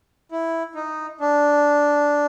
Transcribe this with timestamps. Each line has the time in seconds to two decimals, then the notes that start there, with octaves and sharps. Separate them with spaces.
0.32 E4
0.75 D#4
1.21 D4